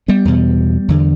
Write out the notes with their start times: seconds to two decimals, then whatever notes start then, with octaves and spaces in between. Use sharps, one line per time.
0.08 G3 B3
0.25 E2 B2
0.88 E2 D3